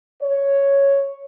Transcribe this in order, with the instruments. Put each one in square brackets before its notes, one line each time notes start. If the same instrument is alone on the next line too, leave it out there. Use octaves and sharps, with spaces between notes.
[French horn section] C#5